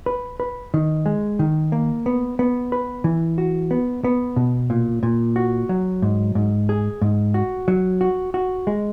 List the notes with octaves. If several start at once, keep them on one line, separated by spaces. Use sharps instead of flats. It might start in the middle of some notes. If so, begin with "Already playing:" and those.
B4
B4
D#3
G#3
D#3
A#3
B3
B3
B4
E3
F#4
B3
B3
B2
A#2
A#2
F#4
F#3
G#2
G#2
G#4
G#2
F#4
F#3
F#4
F#4
G#3